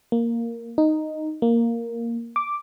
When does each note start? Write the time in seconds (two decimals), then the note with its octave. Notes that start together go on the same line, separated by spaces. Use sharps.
0.12 A#3
0.78 D#4
1.42 A#3
2.36 D6